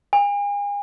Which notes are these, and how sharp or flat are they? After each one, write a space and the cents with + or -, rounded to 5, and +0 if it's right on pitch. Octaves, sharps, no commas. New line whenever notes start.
G#5 -40